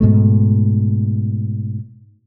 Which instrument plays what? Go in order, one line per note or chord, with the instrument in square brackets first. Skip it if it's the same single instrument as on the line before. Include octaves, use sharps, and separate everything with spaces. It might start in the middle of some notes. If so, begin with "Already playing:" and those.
[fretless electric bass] G#2 B2 A3